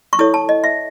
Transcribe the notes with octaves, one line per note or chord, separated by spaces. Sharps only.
C#6
E4 A4 C#5 D#6
A5
D#5
E5